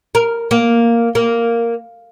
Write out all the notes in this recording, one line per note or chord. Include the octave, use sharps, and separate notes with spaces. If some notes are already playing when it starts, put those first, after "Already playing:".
A#4
A#3
A#3